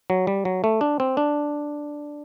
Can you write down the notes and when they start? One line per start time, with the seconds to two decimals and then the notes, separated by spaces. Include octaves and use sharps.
0.10 F#3
0.27 G3
0.45 F#3
0.64 A3
0.81 D4
1.00 C4
1.17 D4